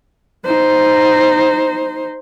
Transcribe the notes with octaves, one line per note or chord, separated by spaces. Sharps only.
D#4 C5